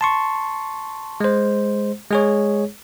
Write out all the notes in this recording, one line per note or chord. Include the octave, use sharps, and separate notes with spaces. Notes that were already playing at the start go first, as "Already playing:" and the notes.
A5 C6 C#6
G#3 C5
G#3 G#4 C#5